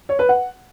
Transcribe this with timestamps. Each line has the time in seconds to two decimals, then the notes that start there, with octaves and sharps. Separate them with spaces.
0.09 C#5
0.19 B4
0.29 F#5